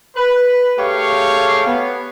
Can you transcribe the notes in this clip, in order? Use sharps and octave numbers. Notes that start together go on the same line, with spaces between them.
B4
A3 G4 G#4 C#5 F5
B3